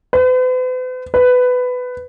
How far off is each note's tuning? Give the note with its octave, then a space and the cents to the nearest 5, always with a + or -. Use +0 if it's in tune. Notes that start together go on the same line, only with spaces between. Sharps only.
B4 +45
B4 +15